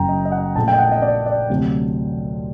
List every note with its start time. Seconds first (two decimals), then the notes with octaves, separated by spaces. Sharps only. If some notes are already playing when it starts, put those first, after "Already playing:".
Already playing: F#1 F#2 F#3 G5 A#5
0.09 D#5
0.25 D#5
0.32 F#5
0.55 A#1 A#2 A3 A5
0.68 G5
0.73 D#5
0.79 F#5
0.92 D#5
1.02 D5
1.26 D5
1.50 D2 C3 F#3